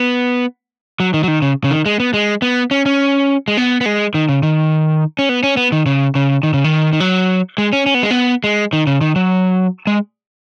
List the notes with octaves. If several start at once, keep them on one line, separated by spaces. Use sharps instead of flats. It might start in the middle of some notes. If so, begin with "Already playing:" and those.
Already playing: B3
F#3
D#3
F#3
D#3
C#3
C#3
D#3
G#3
B3
G#3
B3
C#4
C#4
G#3
B3
B3
G#3
D#3
C#3
D#3
C#4
B3
C#4
B3
D#3
C#3
C#3
D#3
C#3
D#3
D#3
F#3
G#3
C#4
C#4
B3
G#3
B3
G#3
D#3
C#3
D#3
F#3
G#3